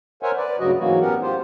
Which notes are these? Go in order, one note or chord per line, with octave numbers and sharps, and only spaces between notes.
A#4 C5 C#5 E5 F#5 G#5
B4 D5
D2 G2 C#3 F#3 F#4 D#5
G#2 E3 F#3 A#3 F#4
A2 B3 C#4 G4 A#4 F#5
F4 G4 C5